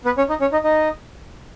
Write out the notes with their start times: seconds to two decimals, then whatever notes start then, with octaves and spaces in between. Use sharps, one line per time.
0.05 B3 B4
0.18 C#4 C#5
0.29 D#4 D#5
0.40 C#4 C#5
0.52 D#4 D#5
0.64 D#4 D#5